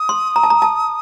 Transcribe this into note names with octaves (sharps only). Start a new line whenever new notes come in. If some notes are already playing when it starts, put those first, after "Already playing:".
Already playing: D#6
C6
A#5
A5
A#5
A5